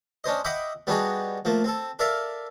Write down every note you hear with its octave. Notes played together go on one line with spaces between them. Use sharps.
C#4 D4 C5 D#5
D#5 E5 F#5 G5 B5 D6
G3 B3 D4 D#4 F#4 G#4
F3 A3 A#3
C4 A4
A4 A#4 D5 E5 F5